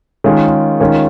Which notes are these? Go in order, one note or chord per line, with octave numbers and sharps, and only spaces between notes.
D#3 G#3 C#4 F4 G#4
D#3 G#3 C#4 F4 A#4